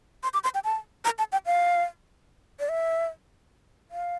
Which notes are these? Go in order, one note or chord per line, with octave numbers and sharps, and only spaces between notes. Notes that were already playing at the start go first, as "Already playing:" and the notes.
C6
D6
C6
G5
A5
A#5
A5
G5
F5
D5
E5
F5